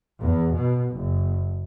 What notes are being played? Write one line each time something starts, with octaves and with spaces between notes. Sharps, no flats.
E2
B2
F#1